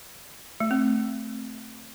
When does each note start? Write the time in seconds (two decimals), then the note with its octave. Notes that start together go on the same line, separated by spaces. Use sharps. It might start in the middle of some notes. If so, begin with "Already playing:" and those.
0.60 A3
0.71 C4